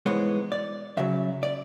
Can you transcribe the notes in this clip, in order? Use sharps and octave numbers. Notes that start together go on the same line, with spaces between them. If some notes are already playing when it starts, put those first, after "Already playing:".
G#2 E3 G#3 B3 C#5
D5
F#2 C#3 F#3 E5
D5